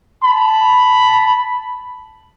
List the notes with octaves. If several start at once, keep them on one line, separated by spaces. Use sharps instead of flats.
A5 B5